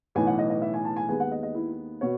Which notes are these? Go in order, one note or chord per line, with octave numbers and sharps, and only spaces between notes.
B1 A2 E3 B3 G#5
F#5
D#5
D#5
E5
G#5
A5
G#5
D#2 D#3 G#3 B3 G#5
F#5
D#5
D#5
E4
B2 C#5